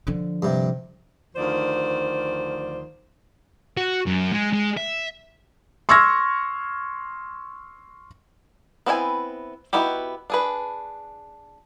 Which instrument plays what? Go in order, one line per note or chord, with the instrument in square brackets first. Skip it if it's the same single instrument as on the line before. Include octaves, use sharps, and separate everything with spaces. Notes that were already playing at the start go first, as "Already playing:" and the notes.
[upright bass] D3 F3
[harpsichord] G2 C3
[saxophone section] D2 D#3 F3 C5 D5
[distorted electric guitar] F#4
F#2
G#3
G#3
E5
[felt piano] C6 C#6 E6 F6 G#6 A#6
[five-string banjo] B3 C4 E4 D#5 G#5
B3 D#4 E4 F#4 G4
D4 G#4 B4